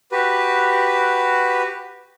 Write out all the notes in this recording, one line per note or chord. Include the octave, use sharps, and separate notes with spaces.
F#4 G4 B4